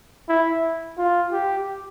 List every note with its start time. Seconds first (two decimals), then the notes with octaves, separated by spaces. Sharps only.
0.29 E4
0.98 F4
1.32 G4